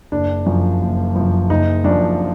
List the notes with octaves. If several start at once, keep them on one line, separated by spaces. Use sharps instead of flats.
F#1 D4
F#2 F3
F#1
F#2 F3
F#1 D#4
F#2 F3 D4